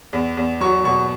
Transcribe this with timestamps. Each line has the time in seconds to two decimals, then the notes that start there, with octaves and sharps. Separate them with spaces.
0.13 E2
0.37 E2
0.61 F#3 C#6
0.84 B2 C#6